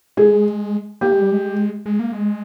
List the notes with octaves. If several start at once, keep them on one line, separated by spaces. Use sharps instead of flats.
G#3 G#4
A#3 G4
G#3
G3
G#3
G#3
A#3
G#3